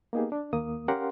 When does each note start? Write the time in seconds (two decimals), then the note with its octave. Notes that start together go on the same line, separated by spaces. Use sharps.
0.13 A#3 B3 D#4 G4 G#4
0.32 D4
0.53 D#2 A#3 D#6
0.88 C#4 G4 A#4 F5 F#5 C6